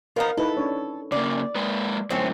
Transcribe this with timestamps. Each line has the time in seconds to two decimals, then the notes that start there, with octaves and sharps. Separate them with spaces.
0.16 F3 B3 D#4 A#4 F5
0.37 D#4 E4 A4 B4
0.57 C#4 D4 C#5
1.12 C#3 A#3 D5
1.56 G#3 A#3 B4 D#6
2.10 F#2 A2 D3 C4 C#4